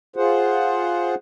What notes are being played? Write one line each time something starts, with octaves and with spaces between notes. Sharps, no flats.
F4 G#4 C5 F#5